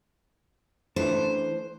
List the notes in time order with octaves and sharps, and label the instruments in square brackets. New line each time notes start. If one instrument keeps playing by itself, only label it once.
[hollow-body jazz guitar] E3 A3 D4 [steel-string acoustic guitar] C5